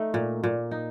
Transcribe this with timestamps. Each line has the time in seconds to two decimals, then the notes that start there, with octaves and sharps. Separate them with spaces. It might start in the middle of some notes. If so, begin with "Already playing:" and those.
Already playing: A3 D#4
0.14 A#2
0.43 A#2
0.71 D#4